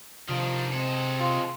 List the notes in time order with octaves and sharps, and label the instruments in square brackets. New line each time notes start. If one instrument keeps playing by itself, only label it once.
[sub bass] C3 [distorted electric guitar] D#3 D4 [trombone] F3
[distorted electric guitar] G#3 A4 [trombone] C4
[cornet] F4